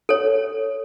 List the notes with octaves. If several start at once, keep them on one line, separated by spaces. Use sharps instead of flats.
A4 C#5